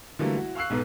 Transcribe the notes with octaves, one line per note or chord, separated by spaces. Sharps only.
D3 E3 F#3 G3 A3 A#3
E4 F#4
F5 C#6 E6 F#6 C7
B1 G#2 B3